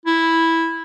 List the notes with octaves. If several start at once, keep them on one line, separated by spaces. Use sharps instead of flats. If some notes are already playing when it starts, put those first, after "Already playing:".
E4